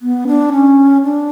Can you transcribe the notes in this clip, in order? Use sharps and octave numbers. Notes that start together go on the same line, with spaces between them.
B3
D4
C#4
D4